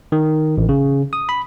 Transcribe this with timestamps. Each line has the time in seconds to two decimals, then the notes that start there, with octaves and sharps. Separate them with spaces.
0.12 D#3
0.58 A1
0.69 C#3
1.13 D#6
1.29 B5